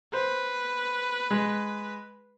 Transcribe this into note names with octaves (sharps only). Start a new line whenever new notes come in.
B4 C5
G#3